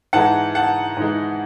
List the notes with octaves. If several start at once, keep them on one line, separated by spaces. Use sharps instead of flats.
G#2 E3 G#3 D#4 F#5 A5
F#5 A5
G#2 E3 G#3 D#4